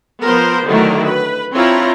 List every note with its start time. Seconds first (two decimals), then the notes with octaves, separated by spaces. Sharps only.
0.25 F3 B3 A#4 C5
0.66 D3 D#3 F#3 A3 E4 A#4
1.04 B4
1.54 C4 D4 E4 F4 C#5 A#5